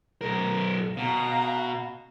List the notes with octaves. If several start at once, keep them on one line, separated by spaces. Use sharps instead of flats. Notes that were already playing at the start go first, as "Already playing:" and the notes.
B1 A#4
B2 F5 A#5